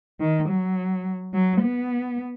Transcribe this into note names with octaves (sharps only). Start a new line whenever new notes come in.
D#3
F#3
F#3
B3